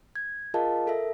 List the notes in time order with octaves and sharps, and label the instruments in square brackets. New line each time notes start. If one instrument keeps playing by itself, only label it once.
[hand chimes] G#6
F4 G#4 A#4 D#5 F5 A5
A4 A#4 E5